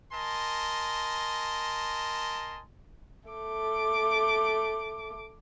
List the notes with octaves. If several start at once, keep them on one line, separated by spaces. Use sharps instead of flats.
A#4 D#5 G#5 A5 C6
A3 D6